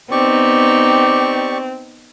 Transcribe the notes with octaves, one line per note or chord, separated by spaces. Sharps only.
B3 C4 D#4 G4 D5 C#6